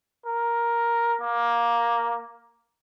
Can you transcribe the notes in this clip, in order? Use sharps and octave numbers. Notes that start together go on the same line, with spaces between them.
A#4
A#3